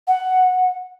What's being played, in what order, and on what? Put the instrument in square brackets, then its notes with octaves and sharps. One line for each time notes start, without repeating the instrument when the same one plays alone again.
[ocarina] F#5